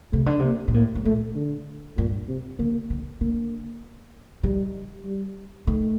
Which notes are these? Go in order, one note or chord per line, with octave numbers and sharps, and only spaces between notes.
C3 A3
D3
C3 A#3
A#2
A2 A#3
A2
A#2 A3
D3
G2 A#2
C3
D3 A#3
D3
D3 A#3
D#3 G3
G3
D#3 A3